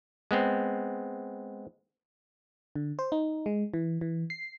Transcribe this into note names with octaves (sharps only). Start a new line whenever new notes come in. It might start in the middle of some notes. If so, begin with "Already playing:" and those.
G#3 B3 C4
D3
C5
D#4
G#3
E3
E3
C7